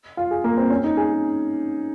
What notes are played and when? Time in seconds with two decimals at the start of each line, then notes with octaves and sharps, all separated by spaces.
0.17 F4
0.31 G#4
0.44 A#3
0.58 C4
0.70 C#4
0.84 D#4
0.97 G#4